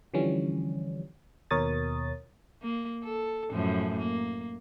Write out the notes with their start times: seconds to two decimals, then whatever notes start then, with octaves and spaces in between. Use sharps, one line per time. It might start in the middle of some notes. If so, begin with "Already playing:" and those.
0.14 D3 E3 F3 G3 C#4
1.51 D#2 B2 A#4 C#5 D#6 A6
2.62 A#3
3.04 A4
3.52 F#2 A2 F3
3.98 A#3